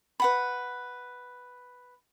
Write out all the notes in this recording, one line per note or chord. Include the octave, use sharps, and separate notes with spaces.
B4 F#5 B5